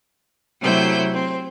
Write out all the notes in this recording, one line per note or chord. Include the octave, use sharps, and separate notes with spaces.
C3 F#3 A3 E4 C5 G6
C4